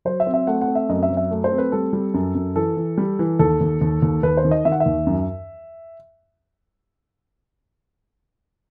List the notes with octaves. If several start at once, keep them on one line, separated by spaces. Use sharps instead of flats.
F#3 C5
E5
C4
E5
A3 F#5
F#5
C4
E5
F#2 D#5
E5
F#3
E5
A3
C5
C4
B4
G3 A4
G3
F#2
F#2
E3 A4
E3
G3
E3
D#2 A4
D#2
D#2
D#2
D#2 B4
C5
D#3
D#5
D#3 E5
F#5
E5
D#2
F#2